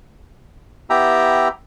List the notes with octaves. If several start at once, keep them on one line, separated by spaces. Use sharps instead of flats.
B3 E4 G4 E5 G5 A#5